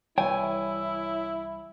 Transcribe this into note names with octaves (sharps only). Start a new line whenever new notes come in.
C2 E3 G3 E4 C#5 G5 G#5